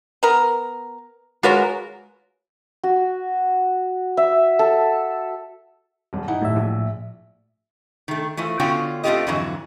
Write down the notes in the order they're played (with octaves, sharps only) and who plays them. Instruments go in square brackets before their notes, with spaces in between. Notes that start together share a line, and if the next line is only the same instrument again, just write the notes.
[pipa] B3 A#4
[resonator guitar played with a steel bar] G#3 F#4 A#4 [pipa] F4 B4 C#5
[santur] F#4
E5
A4
[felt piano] D#1 G2
D#4 E4 F#5
[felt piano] D#1 [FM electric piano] A2 E5
[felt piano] A#1
[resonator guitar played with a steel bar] D#3 A3
E3 F3 A3
D3 B3 C#4 F4 F#4 G5
A3 C4 D#4 F4 G4 D#5
F2 G#2 D3 E3 F#3